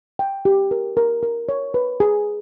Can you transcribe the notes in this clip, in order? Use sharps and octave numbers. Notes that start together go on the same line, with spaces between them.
G5
G4
A#4
A#4
A#4
C#5
B4
G#4